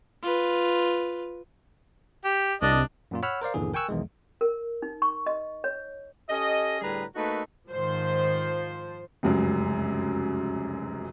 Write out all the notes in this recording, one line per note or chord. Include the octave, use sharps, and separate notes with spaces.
F4 B4
G4
C2 D4 D#5
F#2 A#2 F4
C#5 F#5 B5 E6 F6
A#4 C5 D5 F5
G1 D#2 A#2 D3 E3 G#4
A#4 G5 G#5 C#6 E6 F#6
B1 E2 D#3 G#3
A#4
D#4
C#6
D#5
C#5
C#4 G4 A4 D#5
A2 D3 G3 G#4 B4 A#5
A3 A#3 D#4 F#4 A4 B4
G#2 D#3 F3 C5
F1 C#2 F#2